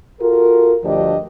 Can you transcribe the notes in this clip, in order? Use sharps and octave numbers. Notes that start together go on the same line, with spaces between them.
F4 F#4 A4 A#4
D2 G2 F3 D4 G4 D#5